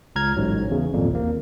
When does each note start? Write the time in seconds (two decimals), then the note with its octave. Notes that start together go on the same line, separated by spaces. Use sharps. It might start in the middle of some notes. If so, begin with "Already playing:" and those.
0.16 C#2 A#5 F6 G#6
0.36 A1 G#2 F#3
0.71 E2 C#3
0.93 G#1 F2 A#2
1.11 D#2 A#3